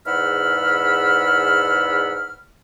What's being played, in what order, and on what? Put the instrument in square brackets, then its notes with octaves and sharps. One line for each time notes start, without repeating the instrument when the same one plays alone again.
[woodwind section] E2 G#2 F#5 B5 E6 F6